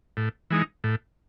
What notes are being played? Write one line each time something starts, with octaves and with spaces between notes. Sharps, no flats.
A2
E3 G#3 D#4
A2